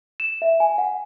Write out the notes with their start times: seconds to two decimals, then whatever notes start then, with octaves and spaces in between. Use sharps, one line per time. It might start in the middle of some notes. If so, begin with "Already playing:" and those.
0.20 E7
0.42 E5
0.60 G#5
0.78 F#5